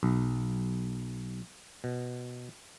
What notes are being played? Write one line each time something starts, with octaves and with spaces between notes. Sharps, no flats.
B1
B2